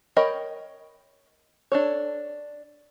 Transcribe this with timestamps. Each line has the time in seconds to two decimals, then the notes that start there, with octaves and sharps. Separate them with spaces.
0.17 A#4 C#5 D#5 G5 B5
1.72 D4 A4 C#5